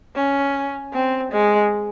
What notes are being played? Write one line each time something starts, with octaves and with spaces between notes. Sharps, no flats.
C#4
C4
G#3